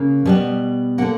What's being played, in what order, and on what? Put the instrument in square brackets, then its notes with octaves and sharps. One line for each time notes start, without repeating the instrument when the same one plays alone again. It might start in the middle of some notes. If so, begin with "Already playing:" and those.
Already playing: [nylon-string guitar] C#3 A#3
B2 G3 B3
D3 A#3 F#5